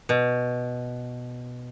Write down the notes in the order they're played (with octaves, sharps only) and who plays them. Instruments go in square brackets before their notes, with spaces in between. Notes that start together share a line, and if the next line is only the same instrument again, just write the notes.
[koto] B2